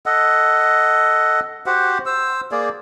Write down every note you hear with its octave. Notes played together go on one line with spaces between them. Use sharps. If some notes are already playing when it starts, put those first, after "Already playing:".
A4 D#5 F#5
F#4 G4 C5 F#5
C5 E6
A#3 G#4 D5